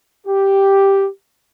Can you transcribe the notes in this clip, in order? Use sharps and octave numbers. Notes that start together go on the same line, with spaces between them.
G4